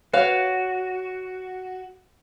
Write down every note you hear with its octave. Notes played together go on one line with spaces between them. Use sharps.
F#4 B4 C#5 F5